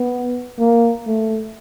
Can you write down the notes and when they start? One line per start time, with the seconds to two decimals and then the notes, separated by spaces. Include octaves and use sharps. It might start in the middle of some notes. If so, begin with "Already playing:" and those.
Already playing: B3
0.59 A#3
1.07 A3